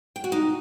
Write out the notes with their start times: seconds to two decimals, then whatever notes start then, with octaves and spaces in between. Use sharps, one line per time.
0.16 G5
0.24 F#4
0.32 D#4